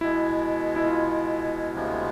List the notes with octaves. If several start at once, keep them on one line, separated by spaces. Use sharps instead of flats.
B2 G#3 B3 E4
E4
F4
D2 C3 F3 G#3 B3